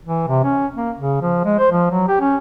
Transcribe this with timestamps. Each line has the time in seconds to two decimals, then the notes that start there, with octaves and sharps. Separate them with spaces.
0.05 E3
0.28 C3
0.44 C#4
0.76 A#3
0.98 C#3
1.22 F3
1.45 G#3
1.59 C5
1.72 F3
1.91 F#3
2.08 G4
2.21 C#4